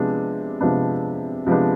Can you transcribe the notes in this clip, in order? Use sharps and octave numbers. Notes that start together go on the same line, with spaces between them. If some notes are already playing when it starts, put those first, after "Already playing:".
Already playing: C3 F3 G#3 B3 D4
C3 F3 G#3 B3 D4
C3 F3 G#3 B3 D4